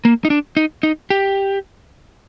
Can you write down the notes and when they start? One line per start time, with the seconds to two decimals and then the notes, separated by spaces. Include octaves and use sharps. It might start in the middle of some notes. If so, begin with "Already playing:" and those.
0.05 A#3
0.25 D#4
0.30 D4
0.57 D#4
0.83 D#4
1.10 G4